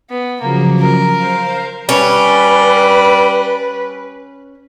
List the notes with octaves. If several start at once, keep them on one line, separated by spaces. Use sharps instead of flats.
B3
C#3 F3 F#3 A#3
A#4
C5 F5
G3 C#4 B4